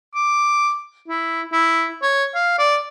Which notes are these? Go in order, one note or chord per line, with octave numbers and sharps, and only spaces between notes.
D6
E4
E4
C#5
F5
D5